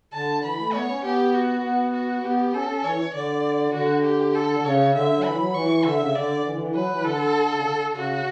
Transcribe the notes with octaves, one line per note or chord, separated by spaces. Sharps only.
D3 A5
E3 B5
A3
B3 C#5
C#4
B3 G4
F#4
B3
F#4
B3 G4
C#4 A4
C#4
E3 C#5
D3 D5
D3 F#4
G4
A4
C#3 C#5
D3 E5
F#3
E3 B5
F#3
E3 C#6
D3 E5
C#3
D3 D5
E3
D3
E3
F#3 B4
E3
D3 A4
C#3
D3
C#3 F#4